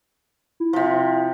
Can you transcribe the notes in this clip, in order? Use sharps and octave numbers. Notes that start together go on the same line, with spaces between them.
E4
C3 F3